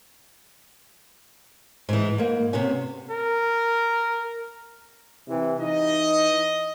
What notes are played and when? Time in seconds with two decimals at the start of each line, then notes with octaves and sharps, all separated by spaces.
1.89 G#2 E3
2.18 G#2 A#3
2.53 C3 B3 C#4
3.11 A#4
5.28 C3 E3
5.59 E3 D#4 D#5